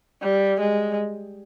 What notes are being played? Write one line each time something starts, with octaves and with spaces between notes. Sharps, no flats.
G3
G#3